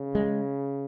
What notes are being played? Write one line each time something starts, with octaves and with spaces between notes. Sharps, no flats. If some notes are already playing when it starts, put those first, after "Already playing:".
Already playing: C#3
G#3